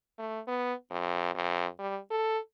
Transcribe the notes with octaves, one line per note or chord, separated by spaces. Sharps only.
A3
B3
F2
F2
G3
A4